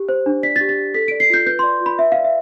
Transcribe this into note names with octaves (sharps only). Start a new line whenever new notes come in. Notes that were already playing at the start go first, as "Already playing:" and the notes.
Already playing: G4
C5
D4
D5 B6
A6
G4
A6
G4
A4 B6
D7
D5
C7
F4 G6
B4 G6
C6
D5
F4
B5
B4 E5
F5
D5
E5